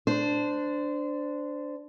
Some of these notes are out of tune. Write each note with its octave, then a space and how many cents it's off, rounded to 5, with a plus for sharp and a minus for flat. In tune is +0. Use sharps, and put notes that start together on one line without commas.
D4 +0 C5 -20